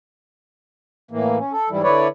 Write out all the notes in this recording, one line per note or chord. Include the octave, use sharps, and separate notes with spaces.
A2 E3 A#3
C#4
A4
G#2 E3 G3 E4
D3 E4 B4 C#5 D5